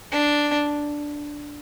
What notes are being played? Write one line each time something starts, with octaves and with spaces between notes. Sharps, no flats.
D4